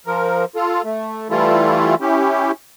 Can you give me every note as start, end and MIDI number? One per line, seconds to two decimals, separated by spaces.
0.07 0.45 53
0.07 0.45 70
0.56 0.82 65
0.56 0.82 69
0.84 1.28 57
1.30 1.95 52
1.30 1.95 55
1.30 1.95 57
1.30 1.95 64
1.30 1.95 65
1.30 1.95 69
2.01 2.51 61
2.01 2.51 64
2.01 2.51 67